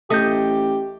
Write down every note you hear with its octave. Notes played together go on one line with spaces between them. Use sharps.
A1 A3 G4 D#5 D#6 G6